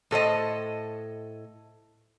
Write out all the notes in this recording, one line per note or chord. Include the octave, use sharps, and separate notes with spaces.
A2 A4 C5 D#5